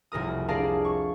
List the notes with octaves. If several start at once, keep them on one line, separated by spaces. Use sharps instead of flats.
F1 C2 A#4 D#6
D4 G#4 A#4 D5 F5 A5
C#6